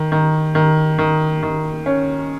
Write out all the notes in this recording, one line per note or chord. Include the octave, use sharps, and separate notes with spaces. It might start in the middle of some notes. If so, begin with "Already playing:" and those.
Already playing: D#3
D#3
D#3
D#3
D#3
C#4